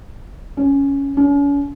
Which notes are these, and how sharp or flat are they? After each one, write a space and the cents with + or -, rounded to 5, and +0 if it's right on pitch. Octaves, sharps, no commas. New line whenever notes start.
C#4 +5
C#4 +40